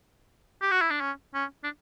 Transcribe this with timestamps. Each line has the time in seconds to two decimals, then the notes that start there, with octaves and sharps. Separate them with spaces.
0.62 G4
0.71 F#4
0.81 E4
0.90 D4
1.01 C#4
1.34 C#4
1.64 D4